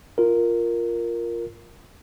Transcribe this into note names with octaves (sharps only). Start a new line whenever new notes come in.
F4 A#4